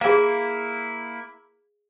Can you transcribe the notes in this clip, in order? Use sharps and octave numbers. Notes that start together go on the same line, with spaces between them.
A#3 E4 G#4 F5